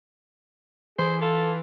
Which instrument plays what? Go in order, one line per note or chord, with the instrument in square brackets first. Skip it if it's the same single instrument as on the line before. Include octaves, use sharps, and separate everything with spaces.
[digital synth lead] E3 [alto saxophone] G#4 [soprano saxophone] C5
[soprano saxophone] F4 [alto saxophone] A4